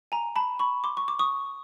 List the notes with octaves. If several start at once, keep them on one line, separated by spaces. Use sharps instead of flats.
G#5 A#5
A5 B5
B5 C#6
C6 D6
C#6
D6
C#6 D#6